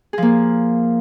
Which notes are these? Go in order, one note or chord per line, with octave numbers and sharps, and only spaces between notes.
F3 A#3 G#4